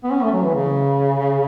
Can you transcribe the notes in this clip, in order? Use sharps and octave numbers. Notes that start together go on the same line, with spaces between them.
B3
C#4
A3
F#3
E3
C#3